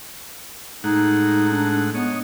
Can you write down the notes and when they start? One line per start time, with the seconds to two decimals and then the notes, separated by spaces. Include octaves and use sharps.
0.84 A2 G#3 D#4 F#5
1.51 D4
1.95 B3 C#5 D#5